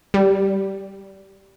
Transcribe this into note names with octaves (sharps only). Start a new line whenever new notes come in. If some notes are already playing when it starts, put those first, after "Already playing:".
G3